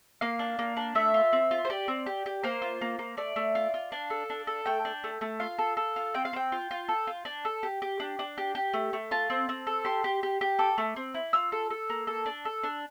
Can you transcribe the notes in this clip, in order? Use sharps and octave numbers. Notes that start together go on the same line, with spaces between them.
A#3 F5
D4
A#3
D4
A3 E5
F4
C4
F4
C5
G4 D5
C4
G4
G4
A#3 C5
F4
A#3
A#3
A3 D5
A3
F4
F4
D4 F5
A4
D4
A4
A3 G5
D4
A3
A3
F4 F5
A4
A4
F4
C4 G5
F5
C4 G5
F4
F4
A4
F4
D4
A4
G4
G4
D4
D4
G4
G4
A3
A3
F4 A5
C4
C4
A4
G4 C6
G4
G4
G4
A4 D6
A3
C4
E4
F4 E6
A4
A4
A#3
A4
D4
A4
D4